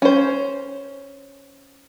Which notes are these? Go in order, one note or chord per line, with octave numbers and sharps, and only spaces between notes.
C#4 C5